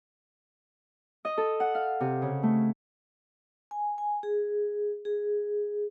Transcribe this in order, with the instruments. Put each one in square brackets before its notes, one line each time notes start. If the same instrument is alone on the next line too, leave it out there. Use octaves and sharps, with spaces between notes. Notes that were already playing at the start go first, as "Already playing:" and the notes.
[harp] D#5
A4
F#5
F5
C3
C#3
A3
[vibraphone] G#5
G#5
G#4
G#4